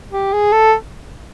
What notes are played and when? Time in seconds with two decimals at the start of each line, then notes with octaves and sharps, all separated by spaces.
0.12 G4
0.33 G#4
0.53 A4